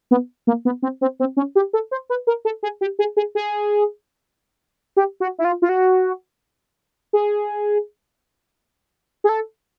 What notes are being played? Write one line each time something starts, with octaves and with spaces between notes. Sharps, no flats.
B3
A#3
B3
C4
C4
C4
C#4
G4
A4
C5
B4
A#4
A4
G#4
G4
G#4
G#4
G#4
G4
F#4
E4
F4
F4
F#4
G#4
G#4
A4